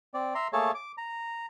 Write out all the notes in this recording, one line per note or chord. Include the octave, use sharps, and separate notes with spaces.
C4 D5
E5 A#5 C6
A3 A#3 G#4 A4 C#5 A5
D6
A#5